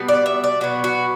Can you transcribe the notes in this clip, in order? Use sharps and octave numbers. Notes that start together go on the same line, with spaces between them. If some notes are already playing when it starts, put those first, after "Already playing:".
Already playing: B2 G3 B3
D5
E5
D5
B2 F#3 B3 F#4
F#4